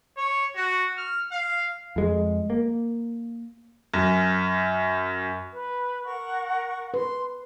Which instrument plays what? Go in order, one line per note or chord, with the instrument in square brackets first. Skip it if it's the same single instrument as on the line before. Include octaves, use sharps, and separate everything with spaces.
[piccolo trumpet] C#5
F#4
F6
F5
[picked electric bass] F2 G#3
A#3
[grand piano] F#2
[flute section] B4
A#4 F#5 C#6
[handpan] B4 [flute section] C6